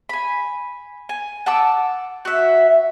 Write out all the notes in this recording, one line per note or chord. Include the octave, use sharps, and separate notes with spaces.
G#5 B5
G#5
F#5 A5 D6 E6
F#4 E5